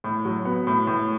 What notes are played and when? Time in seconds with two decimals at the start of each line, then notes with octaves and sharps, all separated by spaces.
0.04 A2
0.25 F#3
0.45 B3
0.67 A2
0.87 A2